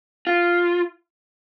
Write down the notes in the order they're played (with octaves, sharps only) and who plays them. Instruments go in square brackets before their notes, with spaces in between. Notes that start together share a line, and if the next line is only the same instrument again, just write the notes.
[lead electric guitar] F4